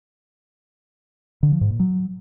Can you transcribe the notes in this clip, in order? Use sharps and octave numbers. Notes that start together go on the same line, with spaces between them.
D3
F3
G#2
A#2
F#3